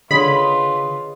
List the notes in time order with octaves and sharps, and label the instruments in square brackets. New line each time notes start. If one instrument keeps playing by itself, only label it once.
[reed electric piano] D3 [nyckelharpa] F4 B4 [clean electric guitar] G#4 C#5 D#5 [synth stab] B5